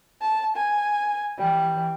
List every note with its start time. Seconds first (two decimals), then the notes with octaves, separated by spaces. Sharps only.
0.22 A5
0.56 G#5
1.39 E3 G3